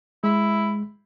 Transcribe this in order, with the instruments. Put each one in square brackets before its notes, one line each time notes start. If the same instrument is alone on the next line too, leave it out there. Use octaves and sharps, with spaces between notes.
[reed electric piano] G#3 [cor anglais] E4